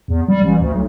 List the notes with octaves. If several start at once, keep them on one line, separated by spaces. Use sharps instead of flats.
E2
G3
A1
D2
B1